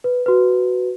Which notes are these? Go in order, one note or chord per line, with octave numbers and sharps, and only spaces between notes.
B4
F#4 B4